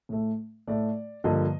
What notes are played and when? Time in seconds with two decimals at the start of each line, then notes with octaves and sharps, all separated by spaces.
0.09 A2 A3
0.67 A2 A3 D5
1.24 G2 D3 F3 A#3 D#5